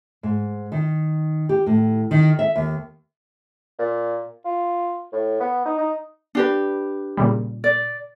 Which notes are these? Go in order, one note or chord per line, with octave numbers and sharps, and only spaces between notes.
G#2
D#3
G4
A2
D#3
E5
D#2
A#2
F4
A2
B3
D#4
D#4
D4 G4 B4
A#2 C#3 G3
D5